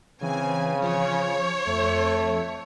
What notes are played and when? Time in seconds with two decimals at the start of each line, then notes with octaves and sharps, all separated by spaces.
0.22 C#3 E3 C4 G#5
0.82 F3 C#5
1.67 F2 A3